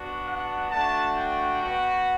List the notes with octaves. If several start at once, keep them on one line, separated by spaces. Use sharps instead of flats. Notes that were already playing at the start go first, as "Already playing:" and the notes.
Already playing: B3 D4 F#4
F#5
A3 D4 F#4 A5
G5
B3 F#4